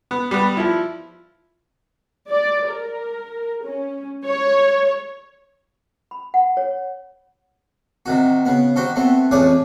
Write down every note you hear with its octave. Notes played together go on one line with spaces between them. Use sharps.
B3
G3 B3
F3 E4
D5
A#4
C#4
C#5
B5
F#5
C#5
C3 D#3 F#4
C#3 B3
D#3 F#4 G4 C5
A3 B3 C4
A1 F2 G#4 C#5 D5